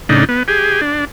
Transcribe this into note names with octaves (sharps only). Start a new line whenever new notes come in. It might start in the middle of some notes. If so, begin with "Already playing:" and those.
A2 C#3 D4 D#4
B3
G4 G#4
D4